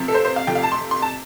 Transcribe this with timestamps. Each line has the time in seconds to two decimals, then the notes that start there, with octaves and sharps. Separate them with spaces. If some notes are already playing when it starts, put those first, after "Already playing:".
Already playing: C3 F3 A3 C4
0.08 A4
0.14 C5
0.25 C5
0.36 F5
0.47 C3 F3 A3 G5
0.55 F5
0.63 A5
0.72 C6
0.91 C6
1.02 A5